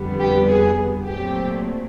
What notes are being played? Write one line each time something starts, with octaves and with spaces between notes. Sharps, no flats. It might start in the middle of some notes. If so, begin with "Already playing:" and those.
Already playing: F2 D3 G3 B3
G4
G#4
A#2 F#3 A3 C4 G4